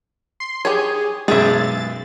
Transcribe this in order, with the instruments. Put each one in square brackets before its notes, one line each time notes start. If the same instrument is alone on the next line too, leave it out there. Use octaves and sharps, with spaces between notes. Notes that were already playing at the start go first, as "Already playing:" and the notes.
[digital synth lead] C6
[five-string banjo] G4 C#5 [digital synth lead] G#4
[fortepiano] B1 F#2 G#3 [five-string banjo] G#4 E5 [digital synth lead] A6